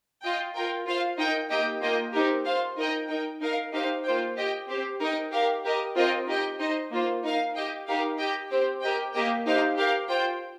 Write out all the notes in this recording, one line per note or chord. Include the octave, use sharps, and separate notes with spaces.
F4 D#5 G5
F4 A#4 G5
F4 C5 F5
D#4 A#4 D#5 G5
A#3 D#4 G4 D#5 G5
A#3 F4 D#5 G5
C4 D#4 G4 A#4
F4 C5 F5
D#4 A#4 D#5 G5
D#4 A#4 G5
D#4 A#4 F5
D#4 G4 C5 F5
A#3 F4 C5 G5
G4 D#5 G5
C4 G4 C5
D#4 A#4 D#5 G5
G4 A#4 F5
G4 A#4 D#5
C4 F4 A#4 D#5 G5
D#4 G4 D#5 G5
D#4 C5 D#5
A#3 F4 C5
D#4 A#4 F5
G4 D#5 G5
D#4 G4 A#4 F5
G4 D#5 G5
C4 G4 C5 G5
G4 A#4 D#5 G5
A#3 G4 D#5 G5
D#4 G4 C5 F5
G4 A#4 F5
F4 C5 G5